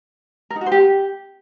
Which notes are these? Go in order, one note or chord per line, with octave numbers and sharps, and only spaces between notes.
A#4
D#4
F#4
C5
G4